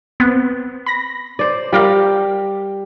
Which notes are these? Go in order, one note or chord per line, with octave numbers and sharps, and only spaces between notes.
B3 C4
B5 A#6
C5 D5
G3 F4 G4 A#4 F5